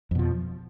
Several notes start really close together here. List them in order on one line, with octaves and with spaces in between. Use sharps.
F2 B2 F3